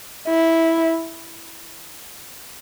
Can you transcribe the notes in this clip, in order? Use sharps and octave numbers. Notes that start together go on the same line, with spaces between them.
E4